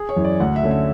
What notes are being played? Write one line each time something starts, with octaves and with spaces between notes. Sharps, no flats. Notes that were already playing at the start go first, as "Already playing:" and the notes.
Already playing: G#4
C#5
F#2 E3
D5
D2 F#5
E5
D3 A3 C#4
E5